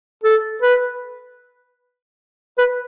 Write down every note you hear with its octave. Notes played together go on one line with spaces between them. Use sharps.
A4
B4
B4